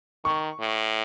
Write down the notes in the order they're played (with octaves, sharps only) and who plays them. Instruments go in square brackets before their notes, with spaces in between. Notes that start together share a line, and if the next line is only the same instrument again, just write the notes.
[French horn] D#3 [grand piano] C#6
[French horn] A2